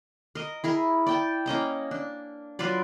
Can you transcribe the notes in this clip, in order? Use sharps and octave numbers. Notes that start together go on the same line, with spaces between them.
A#4 D#5
E4 G#4 A#4
D5 G5 A5
A#3 C#4 D#5 A#5
D4
F#3 F4 B4 D5